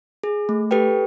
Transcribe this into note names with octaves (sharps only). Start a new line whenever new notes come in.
G#4
A3
G4 A4 B4 G5